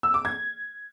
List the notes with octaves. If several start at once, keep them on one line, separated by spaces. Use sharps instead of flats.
E6
D6
G#6